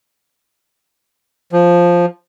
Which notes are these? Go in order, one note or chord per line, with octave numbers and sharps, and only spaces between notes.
F3